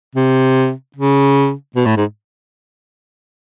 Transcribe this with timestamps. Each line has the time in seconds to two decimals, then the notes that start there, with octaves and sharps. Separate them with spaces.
0.15 C3
0.96 C#3
1.76 B2
1.86 A2
1.97 G#2